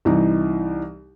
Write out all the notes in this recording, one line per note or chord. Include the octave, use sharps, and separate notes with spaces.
C2 E3 D#4